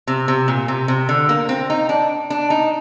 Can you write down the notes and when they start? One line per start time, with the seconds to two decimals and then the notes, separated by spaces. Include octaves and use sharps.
0.07 C3
0.28 C3
0.48 A#2
0.68 C3
0.88 C3
1.09 D3
1.29 A#3
1.49 C4
1.70 D#4
1.89 D4
2.30 D4
2.50 D#4